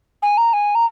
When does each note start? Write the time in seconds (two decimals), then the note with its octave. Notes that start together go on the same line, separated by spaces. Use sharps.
0.22 G#5
0.38 A#5
0.53 G#5
0.75 A#5